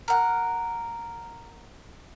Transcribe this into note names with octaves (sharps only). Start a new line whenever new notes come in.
A#4 F#5